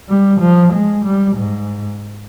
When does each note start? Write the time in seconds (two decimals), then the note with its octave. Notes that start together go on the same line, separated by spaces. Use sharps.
0.09 G3
0.41 F3
0.73 G#3
1.05 G3
1.37 G#2